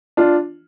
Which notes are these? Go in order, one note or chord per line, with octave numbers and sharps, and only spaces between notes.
D4 F4